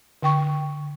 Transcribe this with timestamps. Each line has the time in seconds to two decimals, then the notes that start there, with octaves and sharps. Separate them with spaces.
0.23 D3 G5 C#6